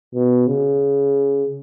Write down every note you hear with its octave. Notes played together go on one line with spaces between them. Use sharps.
B2
C#3